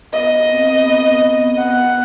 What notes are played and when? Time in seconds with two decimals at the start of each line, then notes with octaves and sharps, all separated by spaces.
0.13 B3 D#5
0.50 C4
0.86 B3
1.22 B3
1.58 B3 F#5